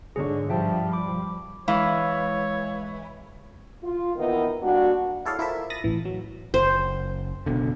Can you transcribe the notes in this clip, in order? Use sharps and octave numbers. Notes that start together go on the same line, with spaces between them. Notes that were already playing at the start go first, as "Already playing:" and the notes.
G#2 D3 G#4 C#5 C#6
G2 F3 G3 E5 G5 A5
B5 D6
E3 G#3 C#5 F5
F4
D#3 E3 A#3 B3 D#4 E4
G3 A#3 D4 F#4
E4 G#4 A4 C#5 D5 F5
E4 F4 A4 A#4 C5 E5
B5 D#6 A6 A#6
A1 E3
F#3
F#1 C5
F#1 B2 D3